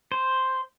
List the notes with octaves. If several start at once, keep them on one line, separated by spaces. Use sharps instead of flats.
C5